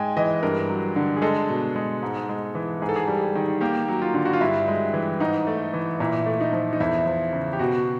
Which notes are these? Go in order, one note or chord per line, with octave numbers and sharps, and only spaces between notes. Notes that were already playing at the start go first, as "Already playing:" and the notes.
Already playing: G#2 G#3 G5 G#5
E3 D#5
G2 A#4
F#3
D3
G#4
G#3 A4
B2
G#3
G#2
G#3
E3
G#2 G#4
A4
G#4
G3
D#3
A#3 G4
F#3
F4
D3
F#4
F4
G2 E4
G#3
E3
G#2 D#4
A3
E3
A#2 E4
A3
D#4
F3
D#4
E2 E4
F3
C#3
G4
B2 F#4